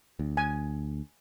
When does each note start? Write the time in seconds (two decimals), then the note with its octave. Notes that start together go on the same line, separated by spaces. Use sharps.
0.19 D2
0.37 G#5